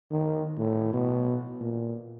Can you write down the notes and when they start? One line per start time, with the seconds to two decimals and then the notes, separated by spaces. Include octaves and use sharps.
0.11 D#3
0.58 A2
0.93 B2
1.61 A#2